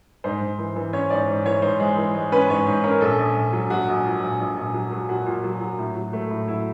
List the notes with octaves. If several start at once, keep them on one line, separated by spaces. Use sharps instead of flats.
G#2 C5
G#2
E3
E3
C#4 C#5
G#2 D5
G#2
E3 C#5
G#2 C5
G#3
E3
G#3
C#4 B4
G#2 C#5
G#2
C#4 A#4
A#1 A4
A#1
A#1
F#3
A#1 F#4
A#1
A#2
A#1
A#1
A#1
F#3
F#3
A#2 F#4
A#2
F#3
F#3
A2
F#3
A3
A2
F#3 E4